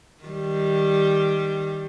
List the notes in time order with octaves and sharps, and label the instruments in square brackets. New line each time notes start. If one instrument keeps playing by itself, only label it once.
[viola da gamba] D#3 G3